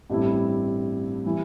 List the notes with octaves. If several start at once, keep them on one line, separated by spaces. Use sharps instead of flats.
A1 G2 G3 C4 E4
E3 G3 E4